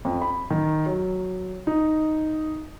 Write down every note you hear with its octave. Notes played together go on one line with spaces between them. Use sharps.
F2
B5
D#3
F#3
D#4